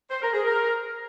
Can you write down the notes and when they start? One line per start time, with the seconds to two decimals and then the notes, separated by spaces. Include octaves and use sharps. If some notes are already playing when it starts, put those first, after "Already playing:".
0.10 C5
0.21 A#4
0.33 G#4
0.44 A#4